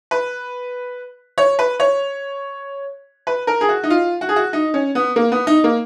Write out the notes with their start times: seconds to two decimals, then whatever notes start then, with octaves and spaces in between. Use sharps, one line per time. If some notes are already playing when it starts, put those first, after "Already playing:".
0.11 B4
1.38 C#5
1.59 B4
1.80 C#5
3.27 B4
3.47 A#4
3.61 G#4
3.69 F#4
3.83 D#4
3.90 F4
4.21 F#4
4.29 G#4
4.36 F#4
4.53 D#4
4.74 C#4
4.95 B3
5.16 A#3
5.32 B3
5.47 D#4
5.64 A#3